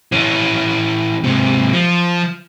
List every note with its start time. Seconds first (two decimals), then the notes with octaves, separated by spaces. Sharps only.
0.12 E3 C#4
1.24 G#2 C3
1.73 F3